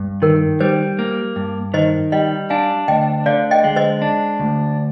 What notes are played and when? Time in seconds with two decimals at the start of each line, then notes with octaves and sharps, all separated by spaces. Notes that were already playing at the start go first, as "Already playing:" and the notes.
Already playing: G2
0.22 D#3 A#4
0.60 G3 C5
0.99 A#3
1.36 G2
1.74 D#3 C5 D#5
2.12 G3 D#5 G5
2.50 D4 F5 G#5
2.88 D2 D#5 G5
3.26 D3 D5 F5
3.51 D#5 G5
3.64 G#3
3.76 C5 D#5
4.02 D4
4.40 D2